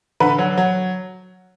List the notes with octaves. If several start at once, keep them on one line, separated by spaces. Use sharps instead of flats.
D3 B4
F#3
F#3